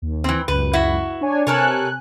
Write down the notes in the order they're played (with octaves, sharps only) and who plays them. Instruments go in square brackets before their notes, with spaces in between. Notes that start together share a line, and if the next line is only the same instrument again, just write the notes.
[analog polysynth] D#2
[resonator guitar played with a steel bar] E3 C4
[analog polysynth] C#2 F#2 [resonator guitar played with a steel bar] B4
[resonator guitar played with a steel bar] E4 F#4
[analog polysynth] D4 C#5 G#5
[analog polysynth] C3 G#5 F#6 [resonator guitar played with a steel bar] A4 A#4 C#5